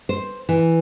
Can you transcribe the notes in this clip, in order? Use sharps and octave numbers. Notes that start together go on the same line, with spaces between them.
C5
E3